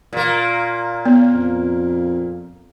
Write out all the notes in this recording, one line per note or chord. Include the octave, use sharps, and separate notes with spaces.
A#2 A#3
B3
F2